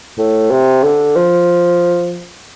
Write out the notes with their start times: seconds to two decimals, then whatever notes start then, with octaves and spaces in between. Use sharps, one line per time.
0.18 A2
0.51 C3
0.83 D3
1.16 F3